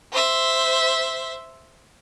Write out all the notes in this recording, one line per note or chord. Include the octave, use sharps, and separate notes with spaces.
C5 E5